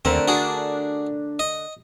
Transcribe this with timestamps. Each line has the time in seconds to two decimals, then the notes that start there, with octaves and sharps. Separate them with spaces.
0.05 D#2 D3 A3 C4 A#4
0.28 D4 F#4 G#4
1.39 D#5